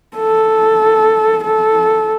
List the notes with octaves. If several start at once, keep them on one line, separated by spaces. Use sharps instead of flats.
A4
A4